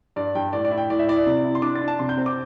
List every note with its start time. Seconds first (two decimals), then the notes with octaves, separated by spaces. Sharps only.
0.16 G2 D5
0.35 G2 G5
0.53 A2 D5
0.65 D5
0.71 E4
0.78 G5
0.90 A2 D5
0.99 E5
1.08 E4 D5
1.26 C3
1.45 E4
1.55 C6
1.62 D4 D6
1.75 A6
1.81 D4
1.88 A5
1.99 C3 C6
2.09 G6
2.18 C4
2.26 D6